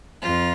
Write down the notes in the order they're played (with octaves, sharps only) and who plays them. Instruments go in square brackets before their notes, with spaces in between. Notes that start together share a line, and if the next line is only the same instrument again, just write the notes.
[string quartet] F2 F4